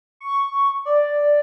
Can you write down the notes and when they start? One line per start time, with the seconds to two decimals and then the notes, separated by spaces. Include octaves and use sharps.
0.20 C#6
0.85 D5